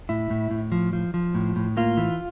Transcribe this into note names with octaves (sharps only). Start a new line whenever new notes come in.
A2 E4
A2
A2
F3
F3
F3
A2
A2
A#3 F4
E3